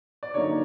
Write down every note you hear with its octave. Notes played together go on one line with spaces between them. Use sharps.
D5
D3 F#3 A#3 D#4 C#5